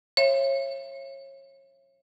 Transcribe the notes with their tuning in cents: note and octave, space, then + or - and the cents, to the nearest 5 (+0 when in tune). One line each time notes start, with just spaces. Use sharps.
C#5 -30 E5 +35